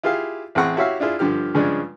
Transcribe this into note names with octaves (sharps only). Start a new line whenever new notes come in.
E4 F4 G4 G#4 F5
A1 C4 G#4 F#5 C#6
E4 F#4 G4 C#5 E5 F5
D4 E4 F4 G#4
G2 D3 F3 G4 F6
G2 C#3 F3 G#3 C#4 D4